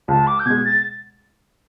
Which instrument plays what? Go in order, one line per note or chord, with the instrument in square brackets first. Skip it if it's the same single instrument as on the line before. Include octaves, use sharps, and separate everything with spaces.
[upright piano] C#2 [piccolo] A5
[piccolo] D6
G6
[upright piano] B2 G#3 [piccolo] G#6
[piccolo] A6